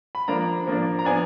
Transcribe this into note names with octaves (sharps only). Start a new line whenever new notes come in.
B5
F3 A#3 D4 A#5
F3 A#3 D4
A#5
F3 B3 D4 G#5